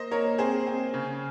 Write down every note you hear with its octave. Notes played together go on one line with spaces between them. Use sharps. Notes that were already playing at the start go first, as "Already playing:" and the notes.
Already playing: A#3 C5 D#5
A#3 A#4 C#5
C4 G#4 C5
C4
C#3